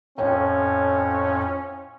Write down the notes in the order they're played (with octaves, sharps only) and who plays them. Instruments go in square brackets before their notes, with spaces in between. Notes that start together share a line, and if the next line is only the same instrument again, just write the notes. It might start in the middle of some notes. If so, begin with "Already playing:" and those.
[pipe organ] F2 A2 [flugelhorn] C#4 [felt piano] C#5 G5